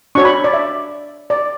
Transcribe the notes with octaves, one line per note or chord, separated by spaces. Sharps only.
D4 F#4 C#5 C#6
B5
D5
E5
D5